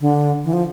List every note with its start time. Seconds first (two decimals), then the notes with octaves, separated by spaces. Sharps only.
0.01 D3
0.44 E3
0.53 F3